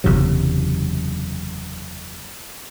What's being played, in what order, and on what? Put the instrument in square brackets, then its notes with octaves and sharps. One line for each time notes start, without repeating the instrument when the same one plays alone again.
[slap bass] F#1 E2 C3 F#3